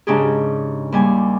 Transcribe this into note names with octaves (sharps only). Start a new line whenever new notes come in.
G#2 C#3 D4 G4 G#4
D#2 G3 G#5